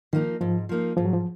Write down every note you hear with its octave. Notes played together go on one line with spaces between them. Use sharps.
D#3 F3 A#3 D#4
G#2 F3
F3 A#3 D#4
G#2 F3
F#3
F3